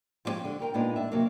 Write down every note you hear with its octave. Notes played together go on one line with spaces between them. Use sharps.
F3 G3 G#3 C#4 G4
D3
G4 A#4 G5
A#2 G#3 B3 D4 D#4 F4
D2 D4 E5
C3 F#3 A#3